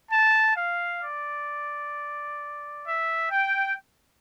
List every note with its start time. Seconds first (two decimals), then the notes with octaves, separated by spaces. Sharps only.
0.11 A5
0.56 F5
1.02 D5
2.86 E5
3.31 G5